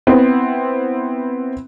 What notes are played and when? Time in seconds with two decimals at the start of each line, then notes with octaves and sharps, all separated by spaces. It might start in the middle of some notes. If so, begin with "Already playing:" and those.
0.07 B3 C4 E4